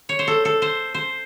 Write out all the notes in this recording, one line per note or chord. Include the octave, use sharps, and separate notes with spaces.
C#5
C5
A4
A4
C5
C5